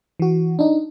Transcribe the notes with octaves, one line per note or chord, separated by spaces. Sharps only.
E3 F#4
D4 D#4